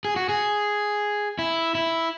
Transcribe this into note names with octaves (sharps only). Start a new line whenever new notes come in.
G#4
F#4
G#4
E4
E4